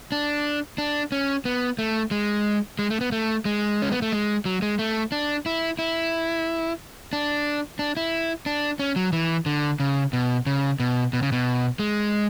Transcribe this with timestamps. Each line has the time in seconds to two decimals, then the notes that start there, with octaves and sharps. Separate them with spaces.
0.12 D4
0.78 D4
1.12 C#4
1.45 B3
1.79 A3
2.11 G#3
2.79 G#3
2.90 A3
3.01 B3
3.12 A3
3.45 G#3
3.82 C#4
3.92 B3
4.02 A3
4.12 G#3
4.45 F#3
4.62 G#3
4.79 A3
5.12 D4
5.46 E4
5.79 E4
7.13 D4
7.79 D4
7.97 E4
8.46 D4
8.79 C#4
8.96 F#3
9.13 E3
9.46 D3
9.80 C#3
10.13 B2
10.46 C#3
10.80 B2
11.13 B2
11.23 C#3
11.32 B2
11.79 G#3